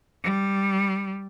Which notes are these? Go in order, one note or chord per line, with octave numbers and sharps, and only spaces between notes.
G3